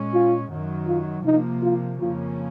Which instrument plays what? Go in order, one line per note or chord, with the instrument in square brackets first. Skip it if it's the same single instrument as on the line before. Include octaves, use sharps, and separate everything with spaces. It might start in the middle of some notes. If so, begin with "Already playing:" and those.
Already playing: [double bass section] A#2 G#3 C#4
[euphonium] F4
[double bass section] F#2 D#3 F#3
[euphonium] F4
[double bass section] C3 F3 A#3 [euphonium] D#4
[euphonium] F4
[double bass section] F2 C#3 F3 A#3 C#4 [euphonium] F4